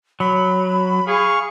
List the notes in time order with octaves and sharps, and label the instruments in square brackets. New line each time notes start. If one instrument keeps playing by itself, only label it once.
[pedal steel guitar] F#3 [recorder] B5
[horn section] G#4 [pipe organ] F5 C#6